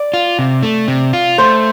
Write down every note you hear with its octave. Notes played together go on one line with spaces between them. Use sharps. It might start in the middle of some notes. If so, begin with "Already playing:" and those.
Already playing: D5
F4
C3
A3
C3
F4
A3 C5